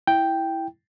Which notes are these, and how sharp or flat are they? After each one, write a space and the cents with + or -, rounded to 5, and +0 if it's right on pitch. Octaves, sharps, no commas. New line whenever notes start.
E4 +0 G5 +0